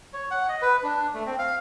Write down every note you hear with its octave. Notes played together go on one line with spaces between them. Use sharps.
C#5
F#5
D#5
B4
D4
A3
C4
F5